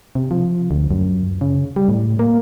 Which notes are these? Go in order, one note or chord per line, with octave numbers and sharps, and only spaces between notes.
C3
F3
D2
F#2
C#3
G3
A2
A#3